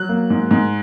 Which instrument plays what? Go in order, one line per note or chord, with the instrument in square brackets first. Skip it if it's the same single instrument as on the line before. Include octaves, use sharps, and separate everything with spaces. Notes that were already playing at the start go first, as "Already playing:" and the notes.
Already playing: [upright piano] F#3 F#6
A#3
G#2
G#2